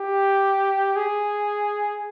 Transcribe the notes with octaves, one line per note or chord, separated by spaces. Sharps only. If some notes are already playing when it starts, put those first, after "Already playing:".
Already playing: G4
G#4